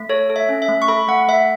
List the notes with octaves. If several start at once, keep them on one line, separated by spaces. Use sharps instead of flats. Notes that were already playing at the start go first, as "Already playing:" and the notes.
Already playing: A3
A4 C#5
A4
E5
C#4
E5
A3
C#6
A4 B5
A3 F#5
A3 E5